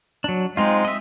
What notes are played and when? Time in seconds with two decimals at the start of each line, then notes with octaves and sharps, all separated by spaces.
0.24 F#3 D4
0.57 G#3 C4 D#4 F4
0.85 D#5 E5